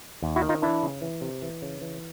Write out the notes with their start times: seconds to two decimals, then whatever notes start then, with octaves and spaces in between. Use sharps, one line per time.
0.23 D#2
0.36 E4 F#4
0.42 D#3
0.49 D#4 F4
0.62 E3 D4 E4
0.83 C#3
1.02 E3
1.21 C3
1.42 E3
1.62 C#3
1.81 E3